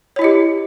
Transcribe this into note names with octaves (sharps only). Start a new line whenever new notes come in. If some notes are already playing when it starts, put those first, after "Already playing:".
E4 G4 C#5 D#5